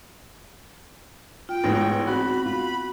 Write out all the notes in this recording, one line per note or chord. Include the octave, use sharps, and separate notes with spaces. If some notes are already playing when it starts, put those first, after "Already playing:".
F4 G5
A1 G#2 B3
B3 C4 F#4 B5
F4 B5